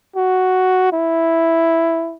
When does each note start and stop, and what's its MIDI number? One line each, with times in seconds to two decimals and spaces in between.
0.16 0.91 66
0.92 2.17 64